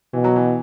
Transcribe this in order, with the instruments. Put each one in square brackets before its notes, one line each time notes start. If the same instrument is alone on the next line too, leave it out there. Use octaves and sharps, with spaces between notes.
[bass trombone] B2 [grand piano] E3
[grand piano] F#3
E3